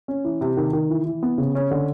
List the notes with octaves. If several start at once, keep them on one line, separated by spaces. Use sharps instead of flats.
C#4
E3
C3
D#3
D#3
E3
E3
B3
C#3
C#4
D3